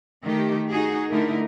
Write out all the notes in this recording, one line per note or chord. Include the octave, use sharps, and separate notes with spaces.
D#3 A3 G4
D#4 F#4 G#4
D3 A3 D#4 E4 A#4